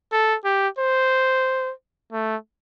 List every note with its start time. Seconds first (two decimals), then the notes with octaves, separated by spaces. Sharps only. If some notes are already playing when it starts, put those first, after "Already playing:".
0.12 A4
0.45 G4
0.79 C5
2.13 A3